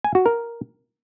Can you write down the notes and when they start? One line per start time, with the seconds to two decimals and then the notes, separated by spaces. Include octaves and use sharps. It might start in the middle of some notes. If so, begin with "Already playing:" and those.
0.04 G#5
0.15 F#4
0.26 A#4